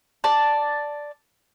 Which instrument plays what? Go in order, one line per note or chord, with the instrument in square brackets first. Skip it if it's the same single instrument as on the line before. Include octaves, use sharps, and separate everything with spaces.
[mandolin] D5 A5